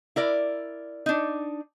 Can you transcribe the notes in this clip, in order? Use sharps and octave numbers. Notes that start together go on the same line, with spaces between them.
E4 A#4 D5
D4 D#4